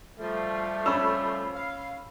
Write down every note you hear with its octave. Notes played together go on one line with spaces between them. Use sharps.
F3 G3 A3 F4
C#4 B5 E6
F5